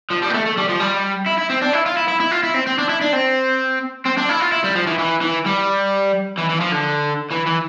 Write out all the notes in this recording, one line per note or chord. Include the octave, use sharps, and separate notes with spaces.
F3
G3
B3
A3
A3
G3
F3
G3
E4
E4
C4
D4
E4
F4
E4
E4
E4
F4
E4
C4
C4
D4
E4
D4
C4
C4
D4
E4
F4
E4
G3
F3
E3
E3
E3
G3
E3
E3
F3
D3
E3
E3